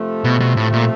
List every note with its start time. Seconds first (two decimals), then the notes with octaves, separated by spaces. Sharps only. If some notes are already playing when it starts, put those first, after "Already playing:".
Already playing: C3 F3 A3
0.24 B2
0.40 B2
0.56 A2
0.73 A#2